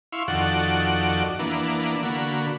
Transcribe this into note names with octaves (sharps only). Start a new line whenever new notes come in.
E4 F5 C6 C#6
F2 D#3 F#4 A4 D5 F#5
E3 A#3 B3 D4
D3 A#3 F#4 B5